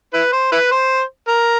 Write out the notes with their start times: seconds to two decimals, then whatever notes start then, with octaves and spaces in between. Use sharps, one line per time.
0.14 E4 B4
0.33 C5
0.52 E4 B4
0.72 C5
1.28 A#4